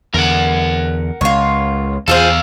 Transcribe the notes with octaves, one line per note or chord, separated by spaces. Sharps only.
E2 D3 A#4 F#5
C#2 F4 C#5
E2 F4 G#4 A4 C5 F5